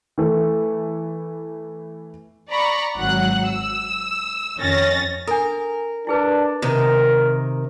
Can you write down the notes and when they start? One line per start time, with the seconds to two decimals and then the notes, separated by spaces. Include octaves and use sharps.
0.18 E3 A3
2.49 D5 A#5 B5 C#6
2.97 G#1 F#3 F#5 F#6
3.46 E6
4.58 F2 D#3 C#4 A6 A#6
5.27 D4 A4 A#4
6.07 D4 E4 G#4 B4
6.62 C3 D#3 A#4